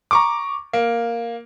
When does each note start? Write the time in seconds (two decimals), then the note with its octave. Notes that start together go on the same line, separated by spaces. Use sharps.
0.11 A#5 C#6 D6
0.73 A#3